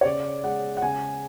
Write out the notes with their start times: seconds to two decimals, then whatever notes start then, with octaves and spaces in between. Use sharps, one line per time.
0.01 C#5
0.05 C#3 D5
0.44 G#3 F#5
0.77 F#5
0.82 C#3 G#5